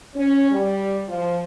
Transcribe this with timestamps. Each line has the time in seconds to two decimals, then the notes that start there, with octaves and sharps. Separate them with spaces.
0.15 C#4
0.51 G3
1.08 F3